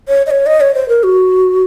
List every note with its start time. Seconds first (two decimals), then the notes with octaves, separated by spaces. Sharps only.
0.08 C#5
0.27 D#5
0.31 C#5
0.46 D#5
0.61 C#5
0.75 C5
0.89 A#4
1.03 F#4